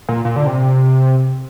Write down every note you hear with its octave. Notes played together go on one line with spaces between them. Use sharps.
A#2
A#2
D3
C3